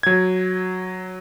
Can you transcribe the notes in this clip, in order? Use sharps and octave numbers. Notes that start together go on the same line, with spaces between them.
F#3 G#6